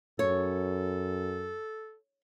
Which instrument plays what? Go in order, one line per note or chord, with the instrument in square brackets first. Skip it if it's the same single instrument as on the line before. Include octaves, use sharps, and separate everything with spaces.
[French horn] F#2 [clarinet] A4 [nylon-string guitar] C#5